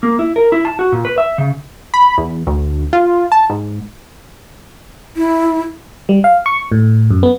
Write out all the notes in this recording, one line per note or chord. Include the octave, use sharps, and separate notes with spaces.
A#3
E4
A#4
E4
A5
F#4
A#2
B4
E5
C#3
B5
E2
D2
F4
A5
G#2
E4
G3
F5
C#6
A2
F#2
B3